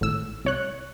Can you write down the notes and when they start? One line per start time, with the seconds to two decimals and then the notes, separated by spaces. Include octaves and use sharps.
0.01 G#1 A2 E6
0.45 C2 C#5 F#6